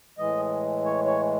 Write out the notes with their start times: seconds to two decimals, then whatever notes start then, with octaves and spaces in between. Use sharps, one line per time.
0.18 A2 E3 G#3 D#5
0.85 C#5
1.06 C#5